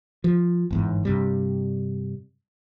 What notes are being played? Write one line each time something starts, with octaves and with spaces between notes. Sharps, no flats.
F3
G1 E2 G#2
G2 C3 G3